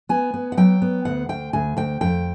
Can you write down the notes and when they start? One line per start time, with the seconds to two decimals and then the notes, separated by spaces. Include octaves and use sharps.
0.09 B3 G#5
0.34 B3
0.52 F#5
0.57 F#3 G5
0.82 B3
1.05 D2 F#5
1.29 D2 G5
1.53 D2 G#5
1.77 D2 G5
2.01 F2 G5